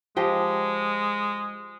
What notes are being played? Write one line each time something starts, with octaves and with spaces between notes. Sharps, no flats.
F3 G#3 G4 D#5